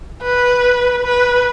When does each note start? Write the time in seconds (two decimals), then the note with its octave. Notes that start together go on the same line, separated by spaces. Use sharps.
0.23 B4
1.04 B4